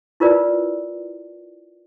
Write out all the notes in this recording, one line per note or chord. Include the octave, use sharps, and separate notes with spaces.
E4 F4 A#4 B4 D5